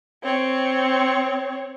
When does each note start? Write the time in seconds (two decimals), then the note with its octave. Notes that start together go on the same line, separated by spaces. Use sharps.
0.24 C4 C#5